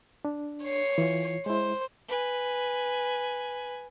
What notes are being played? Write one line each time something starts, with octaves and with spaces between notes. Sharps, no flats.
D4
C#5 C7
E3 F4
G#3 E4 C5
B4 G#5